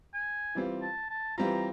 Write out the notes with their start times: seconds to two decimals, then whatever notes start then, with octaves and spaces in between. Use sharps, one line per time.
0.14 G#5
0.55 E3 G3 C4 F4
0.82 A5
1.10 A5
1.38 E3 G3 C4 F4 A#5